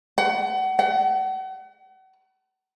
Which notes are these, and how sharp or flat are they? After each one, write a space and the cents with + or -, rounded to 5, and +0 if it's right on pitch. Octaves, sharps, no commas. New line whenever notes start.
F#5 +30
F#5 +40